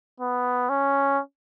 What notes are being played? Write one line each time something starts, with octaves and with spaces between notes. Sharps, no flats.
B3
C#4